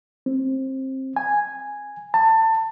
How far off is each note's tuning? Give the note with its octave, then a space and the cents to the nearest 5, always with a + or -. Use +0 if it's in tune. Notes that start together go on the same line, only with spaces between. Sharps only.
C4 +20
G#5 -5
A5 +25